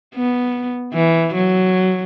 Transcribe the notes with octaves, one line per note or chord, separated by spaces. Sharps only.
B3
E3
F#3